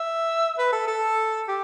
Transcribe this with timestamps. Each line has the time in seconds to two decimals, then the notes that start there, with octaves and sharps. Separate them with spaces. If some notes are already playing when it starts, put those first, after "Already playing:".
Already playing: E5
0.58 B4
0.72 A4
0.88 A4
1.49 G4